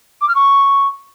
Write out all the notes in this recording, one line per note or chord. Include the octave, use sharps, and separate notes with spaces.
D6
F6
C#6